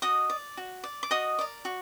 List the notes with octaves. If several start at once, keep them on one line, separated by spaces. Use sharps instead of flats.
F#4 D#5 D#6
D5
F#4
D5
D6
F#4 D#5 D#6
A#4 D5
F#4